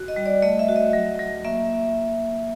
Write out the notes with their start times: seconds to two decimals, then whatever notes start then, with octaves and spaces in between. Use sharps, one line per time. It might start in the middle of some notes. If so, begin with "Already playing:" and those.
Already playing: F#4
0.08 D#5
0.16 G3
0.26 D5
0.42 A3 D#5
0.59 E5
0.69 F#4
0.76 D#5
0.93 F#3
1.19 F#3
1.45 A#3 E5